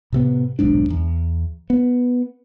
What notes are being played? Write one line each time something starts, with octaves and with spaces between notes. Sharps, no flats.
A2 C3 B3
D#1 B1 G#2 D4
E2
B3